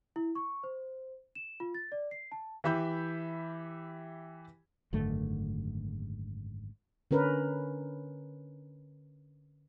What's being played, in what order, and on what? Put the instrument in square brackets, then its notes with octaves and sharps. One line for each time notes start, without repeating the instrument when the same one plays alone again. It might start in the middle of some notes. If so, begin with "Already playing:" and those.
[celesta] E4
C#6
C5
E7
F4
A6
D5
C7
A5
[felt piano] E3 G4 E5 B5 G6 B6
[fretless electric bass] G#1 F#2 D3 A3
[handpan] D3 C#4 A#4 B4